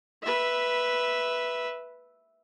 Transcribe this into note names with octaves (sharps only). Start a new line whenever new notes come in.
B4 E5